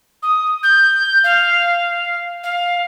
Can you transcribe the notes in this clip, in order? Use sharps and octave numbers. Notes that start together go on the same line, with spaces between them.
D#6
G6
F5
F5